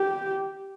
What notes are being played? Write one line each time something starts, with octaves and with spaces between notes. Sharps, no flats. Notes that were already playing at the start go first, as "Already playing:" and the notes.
Already playing: G4